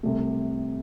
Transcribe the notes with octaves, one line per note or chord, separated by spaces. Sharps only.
C2 C3 A3